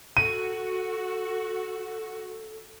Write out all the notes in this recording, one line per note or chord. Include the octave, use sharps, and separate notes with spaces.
F#4 A4 D#7